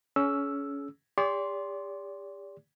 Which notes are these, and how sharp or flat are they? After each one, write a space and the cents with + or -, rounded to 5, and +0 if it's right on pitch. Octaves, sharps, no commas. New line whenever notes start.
C#4 +20 G#4 +40 E6 +0
G4 +40 D5 -35 C6 +0